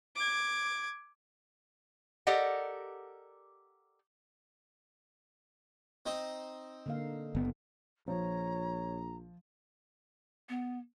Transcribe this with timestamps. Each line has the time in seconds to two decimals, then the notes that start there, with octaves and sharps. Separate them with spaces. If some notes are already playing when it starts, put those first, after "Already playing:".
0.16 D6 G#6
2.27 G4 A4 A#4 D5 D#5 F#5
6.06 C4 D#4 C5
6.86 D3 A#3 F5
7.35 F#1 B3
8.08 A#1 F3 C#5 A#5
10.49 B3